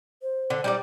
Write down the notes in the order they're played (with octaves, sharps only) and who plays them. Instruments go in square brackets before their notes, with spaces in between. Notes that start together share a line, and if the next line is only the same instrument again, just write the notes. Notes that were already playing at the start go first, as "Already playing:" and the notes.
[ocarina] C5
[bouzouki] D3
G3 D#4 D5